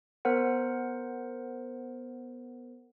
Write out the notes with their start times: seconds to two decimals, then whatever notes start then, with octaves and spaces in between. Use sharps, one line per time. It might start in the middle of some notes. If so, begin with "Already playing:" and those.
0.25 B3 A#4 C5 F#5